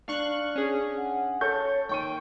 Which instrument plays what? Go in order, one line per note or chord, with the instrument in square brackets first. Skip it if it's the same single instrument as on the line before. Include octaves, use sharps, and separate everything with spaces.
[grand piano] D4 [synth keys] F5 C#6 F#6
[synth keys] C#4 G#4
[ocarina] F#5
[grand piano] A4 C#6 G6 [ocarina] C#5
[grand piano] D#2 C#6 D#7 [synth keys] G5